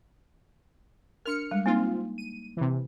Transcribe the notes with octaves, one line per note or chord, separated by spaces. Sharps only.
D4 A#4 F6 C#7
G3 G#3
A#3 C4 D#4 F4
D#7
C3 E3